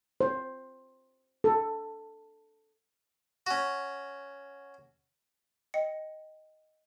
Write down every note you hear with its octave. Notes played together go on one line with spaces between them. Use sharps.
C5
A4
C#4 F#4
D#5 G5 C#7